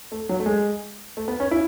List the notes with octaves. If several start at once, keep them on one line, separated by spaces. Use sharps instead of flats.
A3
F#3
A3
G#3
A3
B3
C#4
E4